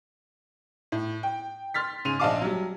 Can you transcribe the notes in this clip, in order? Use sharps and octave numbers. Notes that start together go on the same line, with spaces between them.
A2
G5
C6 F6 A6 B6
G#2 C#3 G#4 C6 D#7 F7
A#1 D4 D#5 F5 A5 D6
F#3 G3